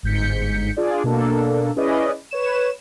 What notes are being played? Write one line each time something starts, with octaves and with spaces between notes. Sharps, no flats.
G1 G#2 G6 B6 C#7
D4 F4 G#4 D5
B2 A#3 D4 A4
C#4 E4 G#4 B4 D5 D#5
B4 C#5 E7